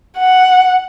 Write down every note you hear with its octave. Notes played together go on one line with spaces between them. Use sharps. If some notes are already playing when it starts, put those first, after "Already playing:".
F#5